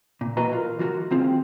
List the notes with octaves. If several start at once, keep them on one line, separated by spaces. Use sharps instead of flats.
A#2
B2 E3 F#4 B4 D#5 A#5
F4 A#4
E3 F4 F#4 A#4
D#3 C4 F4 G#4